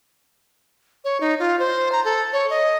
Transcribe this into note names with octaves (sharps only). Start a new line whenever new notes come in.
C#5
D#4
F4
C5
A#5
A4
C#5
D#5